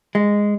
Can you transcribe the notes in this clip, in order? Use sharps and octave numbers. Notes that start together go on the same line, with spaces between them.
G#3